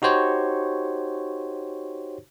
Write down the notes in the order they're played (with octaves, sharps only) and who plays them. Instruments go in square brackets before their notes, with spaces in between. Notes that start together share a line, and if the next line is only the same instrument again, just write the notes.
[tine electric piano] D#4 F#4 G4 C5 C#5